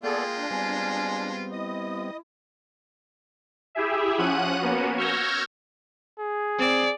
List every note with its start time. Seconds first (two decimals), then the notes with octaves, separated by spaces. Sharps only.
0.03 G#3 A#3 B3 F4 G#4 A4 D5 G5
0.35 D4
0.50 G3 B3 C4 G#5
1.52 E4 D#5 D#6
3.75 E4 G4 G#4 E5
4.18 F3 C#4 F#5 F#6 D#7
4.59 A#3 B3 C#4 F#4
4.97 C#6 E6 F6 G6 G#6 A#6
6.18 G#4
6.59 C4 D5